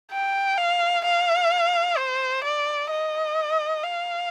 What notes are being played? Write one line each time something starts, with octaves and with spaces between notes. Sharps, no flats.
G5
F5
F5
C5
D5
D#5
F5